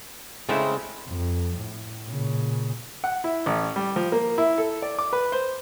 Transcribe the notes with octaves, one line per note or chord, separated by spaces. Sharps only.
C#3 G#3 A3 C4 E4
F2
A2
A#2 C#3
F#5
E4
A1
G3
F3
A#3
E4
A4
D5
D6
B4
C5